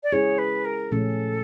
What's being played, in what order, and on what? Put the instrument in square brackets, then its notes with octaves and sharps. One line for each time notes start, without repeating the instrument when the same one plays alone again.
[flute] D5
[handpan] G#3 C#4 E4 G#4 [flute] C#5
[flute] B4
A#4
[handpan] A#2 F3 A3 C#4 [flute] A4